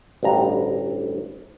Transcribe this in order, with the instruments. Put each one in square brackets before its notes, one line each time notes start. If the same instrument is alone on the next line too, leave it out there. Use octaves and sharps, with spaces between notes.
[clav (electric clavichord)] A1 D2 G2 A#5